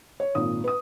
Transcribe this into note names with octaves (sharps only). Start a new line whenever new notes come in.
C#5
G#1 A#2 D#6
B4 D#6